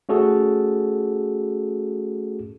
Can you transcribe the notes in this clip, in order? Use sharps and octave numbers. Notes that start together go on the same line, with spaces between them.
A3 C#4 F#4 G#4 A4